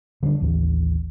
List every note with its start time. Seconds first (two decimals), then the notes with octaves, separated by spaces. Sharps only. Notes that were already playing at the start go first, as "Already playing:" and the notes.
0.23 D3 G3 C#4 D4
0.41 A1 D#2 E3